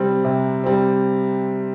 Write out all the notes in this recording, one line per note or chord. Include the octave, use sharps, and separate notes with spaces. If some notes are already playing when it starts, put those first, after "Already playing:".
Already playing: C3 G3 C4
C3
G3 C4